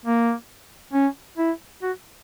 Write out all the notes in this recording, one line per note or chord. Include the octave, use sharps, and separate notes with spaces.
A#3
C#4
E4
F#4